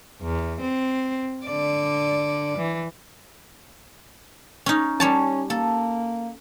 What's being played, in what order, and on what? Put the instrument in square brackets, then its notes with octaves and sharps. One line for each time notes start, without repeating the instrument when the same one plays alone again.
[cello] E2
C4
D3 D5
E3
[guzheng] C#4 D#4
[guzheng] G3 C#5 A5 [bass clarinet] C#4
[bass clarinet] A#3 [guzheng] A4